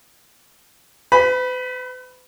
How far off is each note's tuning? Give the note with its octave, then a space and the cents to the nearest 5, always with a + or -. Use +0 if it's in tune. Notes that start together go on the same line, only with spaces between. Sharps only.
B4 +40 B5 -10